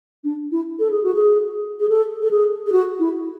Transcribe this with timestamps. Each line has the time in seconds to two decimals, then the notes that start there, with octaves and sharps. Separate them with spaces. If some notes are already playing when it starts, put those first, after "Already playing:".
0.24 D4
0.51 E4
0.79 A4
0.90 G#4
1.03 F#4
1.14 G#4
1.80 G#4
1.89 A4
2.21 A4
2.30 G#4
2.66 G#4
2.72 F#4
2.99 E4